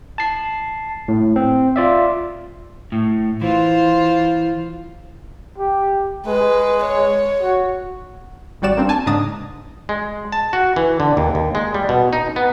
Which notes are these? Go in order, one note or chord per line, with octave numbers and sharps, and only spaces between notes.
A5 C7
A2
C4
F4 D5 E5
A2
E3 F4 C5
G4
G#3 B4
C#5
F#4
G#1 G3 F#4 D5 E7
A#3 C4 D4
G#5 A5
G#2 C#3 D4 A#5 D#6 A6
G#3
A5
F#4
E3
D3
D#2
D#2
G#3
G3
B2
D#4
B3